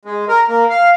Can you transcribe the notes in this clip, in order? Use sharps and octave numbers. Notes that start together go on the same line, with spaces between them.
G#3
A#4
A#3
F5